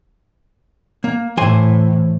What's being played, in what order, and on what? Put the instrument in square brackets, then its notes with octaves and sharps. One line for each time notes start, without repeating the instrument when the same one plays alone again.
[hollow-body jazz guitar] A#3
[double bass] A2 [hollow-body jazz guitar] E3 C5 G#5